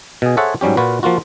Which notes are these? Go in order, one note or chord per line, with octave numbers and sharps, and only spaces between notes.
B2 G#4
G#4 A4 C5 C#5 E5 F#5
G#2 F#3 G3 C#4 G4
A#2 F4 F#4 B4
F3 A#3 F4 F#4